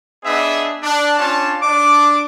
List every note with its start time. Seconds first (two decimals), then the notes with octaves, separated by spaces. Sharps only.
0.25 B3 D4 G#4 D#5 E5
0.82 D4
1.18 C#4 D4 F4 C#5 A5
1.62 D4 D6